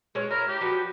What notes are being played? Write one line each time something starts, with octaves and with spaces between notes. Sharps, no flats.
G#3 C#4 C#5
E4 A#4
G4
F3 F#4 B4